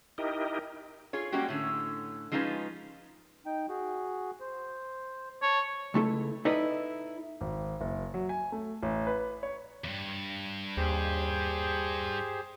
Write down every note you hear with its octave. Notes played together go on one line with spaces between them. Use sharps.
D#4 E4 G4 A#4 D#5
F4 G#4 C#5
G3 G#3 A#3 C#4 F#4 G4
A2 D3 C#4
F3 G#3 C#4 D#4 F4 B4
D#4 G5
F#4 G#4
C5
C#5 A5 C#6
C#2 A3 E4 A4
D#4 E4 A4 B4 D5 D#5
G#1
F#1
F#3
G#5
A3
A1
B4
C#5
E2 G2
D#2 G4 G#4 C5